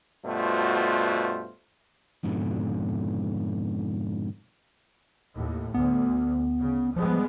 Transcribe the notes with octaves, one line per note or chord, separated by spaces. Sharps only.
G2 B2 A3 F4 F#4 C5
F2 G#2 B2 D3
D#2 A2
D2 B3
C#3
F3 G3 G#3 B3